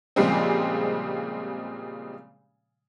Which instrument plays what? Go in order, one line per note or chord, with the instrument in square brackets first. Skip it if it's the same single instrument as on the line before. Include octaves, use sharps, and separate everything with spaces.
[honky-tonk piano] A#2 C#3 F3 G3 G#3 C4